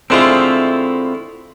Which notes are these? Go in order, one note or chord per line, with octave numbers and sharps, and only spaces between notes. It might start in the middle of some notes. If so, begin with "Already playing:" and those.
D3 G#3 A3 C4 E4 F4